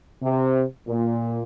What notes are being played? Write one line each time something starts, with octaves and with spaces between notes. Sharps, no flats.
C3
A#2